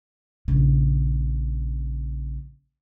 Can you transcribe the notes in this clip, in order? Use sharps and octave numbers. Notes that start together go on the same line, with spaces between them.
A#1 C#3